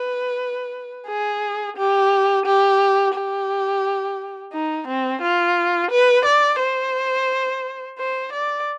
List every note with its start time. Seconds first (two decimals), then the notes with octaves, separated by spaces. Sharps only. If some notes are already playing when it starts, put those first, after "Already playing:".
Already playing: B4
1.07 G#4
1.77 G4
2.46 G4
3.15 G4
4.53 D#4
4.87 C4
5.22 F4
5.91 B4
6.25 D5
6.60 C5
7.98 C5
8.33 D5